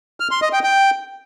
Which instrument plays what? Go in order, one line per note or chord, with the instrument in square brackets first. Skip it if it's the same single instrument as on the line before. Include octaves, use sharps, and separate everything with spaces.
[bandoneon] F6
C6
D#5
G5
G5